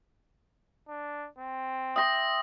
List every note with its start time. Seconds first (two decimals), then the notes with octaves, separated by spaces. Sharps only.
0.88 D4
1.38 C4
1.96 E5 G5 C6 D#6 A#6